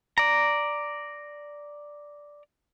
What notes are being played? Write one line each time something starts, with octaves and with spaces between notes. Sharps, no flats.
D5 A#5